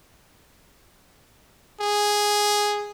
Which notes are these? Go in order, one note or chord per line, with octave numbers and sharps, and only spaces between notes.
G#4